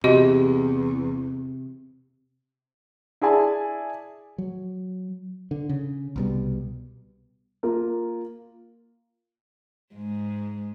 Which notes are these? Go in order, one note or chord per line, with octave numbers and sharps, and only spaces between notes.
E2 C3 F#4 G4 D#5
E4 G#4 D5 G#5 A5
F#3
D3
C#3
C2 B2 G3
A#3 F4 A#4
G#2 G#3